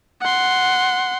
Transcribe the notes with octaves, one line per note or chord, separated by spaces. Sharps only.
F#5 C6